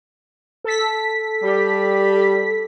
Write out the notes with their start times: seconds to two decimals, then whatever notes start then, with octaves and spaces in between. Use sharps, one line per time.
0.64 A4 B6
1.43 G3